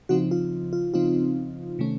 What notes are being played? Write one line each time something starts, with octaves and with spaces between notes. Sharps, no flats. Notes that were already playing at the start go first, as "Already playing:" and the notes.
C#3 F3 C4 D#4 F#4
F4
F4
C#3 F3 C4 D#4 F4
C3 D#3 A3 C#4